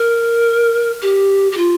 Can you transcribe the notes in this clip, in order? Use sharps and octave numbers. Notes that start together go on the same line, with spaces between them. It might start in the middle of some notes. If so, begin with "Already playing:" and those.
Already playing: A#4
G4
G4
F4